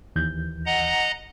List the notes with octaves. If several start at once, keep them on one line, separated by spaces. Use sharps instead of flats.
D#2 E3 G6
D#5 F#5 A#5